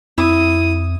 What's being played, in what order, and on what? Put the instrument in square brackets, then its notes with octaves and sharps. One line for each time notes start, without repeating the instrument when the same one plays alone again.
[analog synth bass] F2 [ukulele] E4 [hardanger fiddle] D#6